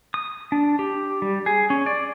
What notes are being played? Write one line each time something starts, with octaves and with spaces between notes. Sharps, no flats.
D#6
D4
G4
G3
G#4
C#4
D5